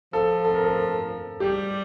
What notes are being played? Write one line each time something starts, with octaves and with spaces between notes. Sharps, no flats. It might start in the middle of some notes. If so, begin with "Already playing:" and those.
F3 A4
A4
A#4
A4
G3 G4